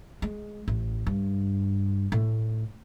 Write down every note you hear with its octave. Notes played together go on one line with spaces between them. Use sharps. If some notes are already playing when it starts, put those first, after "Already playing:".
G#3
A1
G2
A2